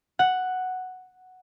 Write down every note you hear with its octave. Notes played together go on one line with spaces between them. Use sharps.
F#5